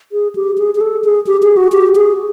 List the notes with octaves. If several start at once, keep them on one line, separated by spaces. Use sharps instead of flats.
G#4
G4
G#4
G#4
A4
G#4
G4
G#4
F#4
G4
G#4